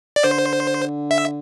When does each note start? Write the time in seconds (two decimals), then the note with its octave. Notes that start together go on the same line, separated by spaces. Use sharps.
0.16 D5
0.24 D3 C5
1.11 E5